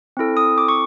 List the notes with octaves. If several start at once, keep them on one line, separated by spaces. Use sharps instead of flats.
C4 E4 A4
D#6
D6
C#6